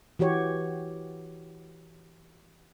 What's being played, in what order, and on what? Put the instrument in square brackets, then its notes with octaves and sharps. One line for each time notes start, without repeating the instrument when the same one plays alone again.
[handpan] E3 F#4 G4 C#5